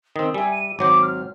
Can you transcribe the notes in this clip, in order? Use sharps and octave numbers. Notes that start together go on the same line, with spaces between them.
D#3 C4 D#6
G3 E5 G#5
D#7
G#1 F#3 C5 D6
F6